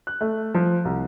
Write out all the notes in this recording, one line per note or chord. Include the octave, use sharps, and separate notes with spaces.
F#6
A3
F3
C2